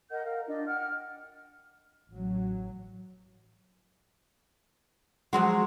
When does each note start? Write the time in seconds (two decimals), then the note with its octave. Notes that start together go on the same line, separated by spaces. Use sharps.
0.10 A#4 D#5 F#5 G6
0.23 A#4 F5
0.46 D4 F4 D#5
0.67 F#5 G5 F6
2.11 A1 F#3
5.33 F3 F#3 G#3 F#4 C6